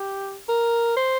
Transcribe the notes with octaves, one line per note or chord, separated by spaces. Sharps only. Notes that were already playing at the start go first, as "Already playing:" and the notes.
Already playing: G4
A#4
C5